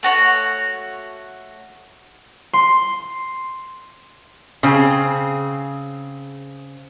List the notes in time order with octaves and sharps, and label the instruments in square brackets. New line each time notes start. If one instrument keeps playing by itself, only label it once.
[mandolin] A3 F#4 C#5
[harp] C6
[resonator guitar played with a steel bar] C#3 C4 G#4